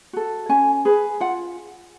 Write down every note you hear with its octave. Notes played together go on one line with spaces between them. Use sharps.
F#4 A4
C#4 G#5
G#4 B4
F4 F#5